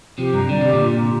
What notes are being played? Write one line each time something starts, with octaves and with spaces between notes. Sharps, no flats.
C3 F3 G4
G2 C3 A#5
D3 D5
C3 G4
A#2 D3
F4
A#5